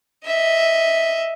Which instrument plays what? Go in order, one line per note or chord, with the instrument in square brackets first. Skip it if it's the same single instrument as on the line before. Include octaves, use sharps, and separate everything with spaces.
[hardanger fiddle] D#5 E5